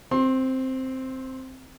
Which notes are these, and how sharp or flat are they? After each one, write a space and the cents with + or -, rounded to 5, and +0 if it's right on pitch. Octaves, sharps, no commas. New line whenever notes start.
C4 +0 C6 +30